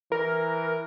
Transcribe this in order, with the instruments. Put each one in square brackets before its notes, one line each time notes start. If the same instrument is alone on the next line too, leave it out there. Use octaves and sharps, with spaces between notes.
[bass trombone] E3 [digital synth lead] A#4